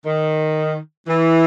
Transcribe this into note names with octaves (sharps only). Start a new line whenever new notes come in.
D#3
E3